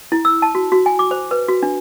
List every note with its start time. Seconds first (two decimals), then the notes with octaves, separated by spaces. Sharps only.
0.12 E4
0.25 E6
0.42 A5
0.55 F#4
0.72 F#4
0.86 G#5
0.99 D6
1.11 C5
1.31 B4
1.48 F#4
1.63 D4